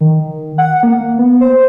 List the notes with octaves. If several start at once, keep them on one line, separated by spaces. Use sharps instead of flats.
D#3
F#5
A#3
B3
C5